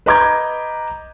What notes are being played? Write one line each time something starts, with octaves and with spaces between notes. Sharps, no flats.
B4 D#5 A#5 D6 G6 G#6